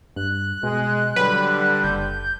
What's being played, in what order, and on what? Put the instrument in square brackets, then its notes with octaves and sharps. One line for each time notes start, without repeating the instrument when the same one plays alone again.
[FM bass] G2 [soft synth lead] F#6
[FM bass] B2 [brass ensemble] G#3
[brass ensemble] D3 G3 [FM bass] F#3 [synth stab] B4
[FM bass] F#1 [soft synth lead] G6